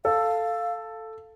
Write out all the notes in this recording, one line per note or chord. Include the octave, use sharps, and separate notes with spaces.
A4 F5